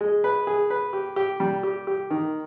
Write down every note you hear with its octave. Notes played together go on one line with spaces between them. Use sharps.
G#3
B4
G#4
B4
G4
G4
G3
G4
G4
D#3